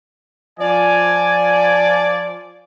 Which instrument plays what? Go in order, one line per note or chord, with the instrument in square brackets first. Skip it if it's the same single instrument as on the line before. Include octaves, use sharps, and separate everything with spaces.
[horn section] F3 D5 [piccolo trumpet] G#5